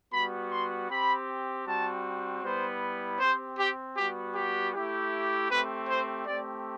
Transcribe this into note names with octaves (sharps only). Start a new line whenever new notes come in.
G3 B3 F#4 B5
C6
C4 G4 B5
G3 C4 F#4 A5
G3 B3 E4 C5
C4 G4 C5
G4
G3 B3 F#4 G4
G4
A3 E4 G4
A3 C4 G4 B4
C5
A3 C4 G4 D5